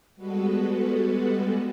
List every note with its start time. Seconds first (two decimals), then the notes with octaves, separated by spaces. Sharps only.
0.16 G3 G#3 B3 F#4 A4 B4